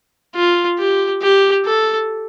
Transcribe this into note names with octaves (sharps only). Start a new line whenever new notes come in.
F4
G4
G4
A4